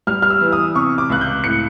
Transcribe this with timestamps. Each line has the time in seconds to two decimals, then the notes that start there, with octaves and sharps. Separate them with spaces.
0.07 G3 F6
0.22 F6
0.30 E6
0.41 E3
0.52 D#6
0.75 C3 C#6
0.98 D6
1.10 C#2 F#6
1.21 G6
1.44 A2 C#7